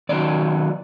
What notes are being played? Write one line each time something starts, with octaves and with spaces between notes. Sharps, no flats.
D#2 D#3 F#3 D5